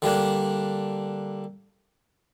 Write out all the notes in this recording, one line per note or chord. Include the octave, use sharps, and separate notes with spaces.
D3 G3 A#3 D4